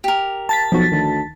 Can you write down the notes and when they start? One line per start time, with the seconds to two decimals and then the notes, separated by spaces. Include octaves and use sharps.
0.04 G4 A#4
0.49 A5 A6 B6
0.72 B1 F3 F#4
0.92 D2 D#3